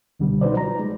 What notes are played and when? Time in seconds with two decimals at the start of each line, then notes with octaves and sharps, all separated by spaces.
0.20 C#2 B2 D3 G3
0.41 D#4 F#4 B4 C5 D5
0.56 F3 A#5
0.79 G#3